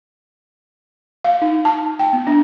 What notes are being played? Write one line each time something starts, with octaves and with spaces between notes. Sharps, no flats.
F5
D#4
A5
G5
B3
D4